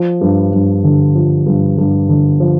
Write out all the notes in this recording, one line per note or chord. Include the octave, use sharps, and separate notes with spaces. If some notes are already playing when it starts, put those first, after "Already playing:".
Already playing: F3
G2
G2
D3
F3
G2
G2
D3
F3